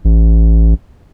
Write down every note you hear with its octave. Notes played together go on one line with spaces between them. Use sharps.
A1